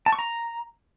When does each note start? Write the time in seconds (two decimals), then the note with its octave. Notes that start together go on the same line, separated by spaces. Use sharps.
0.06 A5
0.13 C#6
0.19 A#5